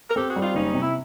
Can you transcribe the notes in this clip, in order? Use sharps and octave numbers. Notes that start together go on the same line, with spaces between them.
A#4
C4 G4 A4
F#4 G#4
G3
D#4 F4
F#1 C#4 D#4
C3
E4